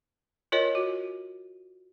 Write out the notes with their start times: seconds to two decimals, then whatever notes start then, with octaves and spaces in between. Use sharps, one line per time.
0.52 F4 A#4 C#5 D#5
0.75 F#4